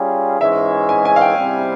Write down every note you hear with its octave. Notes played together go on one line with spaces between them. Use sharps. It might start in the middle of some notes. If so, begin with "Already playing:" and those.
Already playing: G3 C#4 F4 G#4
G#2 E3 G#3 C#4 E5
G#5
G#5
F5
G5
C3 G3 C4 E4